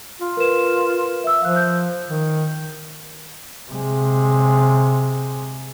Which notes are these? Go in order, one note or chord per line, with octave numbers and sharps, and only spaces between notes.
F4
A#4 B4 E7
E5 E6
F3 F5 F#6
G6
D#3
C3 G#3